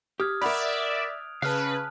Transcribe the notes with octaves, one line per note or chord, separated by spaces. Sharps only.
G4 D#6 F6 G#6
A#4 D5 E5 F#5 B5 F#6 D7 F7
C#3 B4 F5 A5 F6 F#6